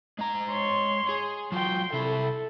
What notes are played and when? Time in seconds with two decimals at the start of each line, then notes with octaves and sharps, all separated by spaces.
0.19 G#3 A#5
0.50 C#5 C6
1.09 G#4
1.52 F#3 F4 G5 C6
1.93 C2 E4 A4